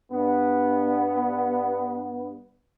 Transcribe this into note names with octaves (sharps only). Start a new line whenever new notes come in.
G2 B3